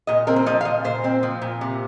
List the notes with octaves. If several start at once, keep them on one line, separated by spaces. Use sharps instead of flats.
A#2 D#5
C4 A#4
C5
F3 D#5
F5
A#2 D#5
A#2 C5
C4
F3
A#2
C3